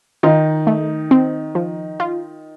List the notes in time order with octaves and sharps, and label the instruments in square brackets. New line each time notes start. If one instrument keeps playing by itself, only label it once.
[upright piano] D#3 D#4 [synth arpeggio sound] F4
[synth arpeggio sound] A3
C4
F3
F4